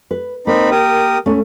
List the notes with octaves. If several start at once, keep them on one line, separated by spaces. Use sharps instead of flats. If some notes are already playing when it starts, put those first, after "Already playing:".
B4
A#3 C4 D#4 B5
G4 A#4 D#6
A3 C#4